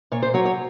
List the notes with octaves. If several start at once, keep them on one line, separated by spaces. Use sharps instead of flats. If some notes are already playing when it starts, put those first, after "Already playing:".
A#2 C#5
C5
F#3 C#5
C#5